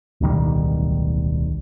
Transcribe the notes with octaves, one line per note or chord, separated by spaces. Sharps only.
D1 B1 D#3 G3